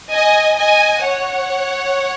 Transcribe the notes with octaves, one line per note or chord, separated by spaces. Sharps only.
D#5 G#5
D#5 G#5
C#5 F#5